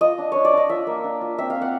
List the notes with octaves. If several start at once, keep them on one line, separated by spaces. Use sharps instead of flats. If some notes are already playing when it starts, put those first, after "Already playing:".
F4 D#5
D4
D4 C#5
D5
D4 D#5
F4 E5
A#3
D4
F4
C4 E5
F5
C4
F#5